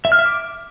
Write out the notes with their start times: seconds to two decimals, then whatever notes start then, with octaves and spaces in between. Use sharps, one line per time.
0.05 E5
0.12 F6
0.19 E5
0.26 D6